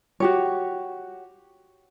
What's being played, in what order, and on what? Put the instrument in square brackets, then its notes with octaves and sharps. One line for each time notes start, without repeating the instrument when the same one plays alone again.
[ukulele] F#4 G4 C#5